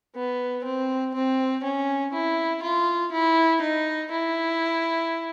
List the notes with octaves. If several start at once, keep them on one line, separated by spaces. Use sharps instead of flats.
B3
C4
C4
C#4
E4
F4
E4
D#4
E4